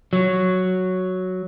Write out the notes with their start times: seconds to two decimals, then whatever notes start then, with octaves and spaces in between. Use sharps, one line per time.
0.13 F#3